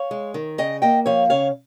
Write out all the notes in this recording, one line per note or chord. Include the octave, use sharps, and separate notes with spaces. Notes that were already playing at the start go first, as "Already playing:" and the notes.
Already playing: C#5 F5
G#3
D#3
C#3 D#5 G5
A#3 D#5 G5
F3 C#5 F5
C#3 C#5 F5